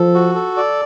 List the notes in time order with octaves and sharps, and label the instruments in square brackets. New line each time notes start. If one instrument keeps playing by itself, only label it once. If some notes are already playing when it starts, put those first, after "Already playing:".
Already playing: [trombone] F3 [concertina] A4
[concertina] F#4
A4
D5